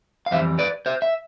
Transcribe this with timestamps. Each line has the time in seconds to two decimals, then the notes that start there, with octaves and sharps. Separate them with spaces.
0.26 F5
0.31 F2 E3 G3 C5 E5
0.59 B4 D5
0.86 C5 E5
1.02 E5